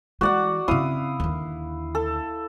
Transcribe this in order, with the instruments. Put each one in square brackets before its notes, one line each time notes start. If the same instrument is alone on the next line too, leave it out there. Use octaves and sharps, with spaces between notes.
[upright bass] E3 G#3 [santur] F#4 D5 F#5
[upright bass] C#3 C4 [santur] E4 F5 D#6
[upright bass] D#2 D3
[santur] A4